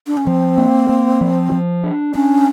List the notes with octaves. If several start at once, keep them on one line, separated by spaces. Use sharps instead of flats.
D4
C#4
F3 C4
A#3
A#3
F3
F3
D4
C#4 D4